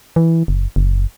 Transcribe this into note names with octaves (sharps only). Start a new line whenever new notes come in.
E3
F#1
F#1